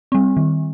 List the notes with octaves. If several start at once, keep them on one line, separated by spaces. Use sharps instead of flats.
G3 C4
D#3